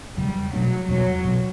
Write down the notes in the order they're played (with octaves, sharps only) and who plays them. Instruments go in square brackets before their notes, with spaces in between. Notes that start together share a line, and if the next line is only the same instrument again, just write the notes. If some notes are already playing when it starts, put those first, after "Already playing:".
[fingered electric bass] E2 C#3 F#3 [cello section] G3
[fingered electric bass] B2 A3 D4 [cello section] F#3
[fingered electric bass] E2 B2 G3 C#4 [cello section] F#3
[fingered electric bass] B2 F#3 C#4